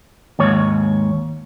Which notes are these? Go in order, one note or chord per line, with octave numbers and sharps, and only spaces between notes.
D#2 G#2 C#5